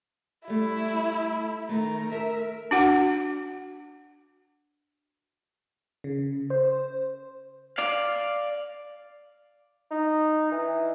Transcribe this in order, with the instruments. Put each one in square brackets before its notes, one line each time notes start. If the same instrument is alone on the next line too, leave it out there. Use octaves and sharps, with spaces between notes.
[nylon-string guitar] G3 A3 [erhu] E4
[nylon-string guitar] D#3 A3 [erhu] A#4
[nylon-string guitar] A#4 [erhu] E5
[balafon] D4 F#4 F#5
[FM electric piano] C#3
C5
[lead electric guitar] D5 F5
[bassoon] D#4
E3